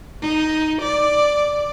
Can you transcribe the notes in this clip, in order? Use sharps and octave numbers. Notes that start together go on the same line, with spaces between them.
D#4
D5